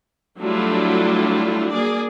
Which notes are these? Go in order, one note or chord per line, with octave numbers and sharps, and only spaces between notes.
F#3 G3 A3 D4 E4 F4
A#3 G#4 D5